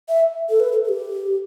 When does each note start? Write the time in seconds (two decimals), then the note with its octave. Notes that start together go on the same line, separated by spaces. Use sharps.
0.09 E5
0.49 A4
0.60 B4
0.72 A4
0.84 A4
0.89 G4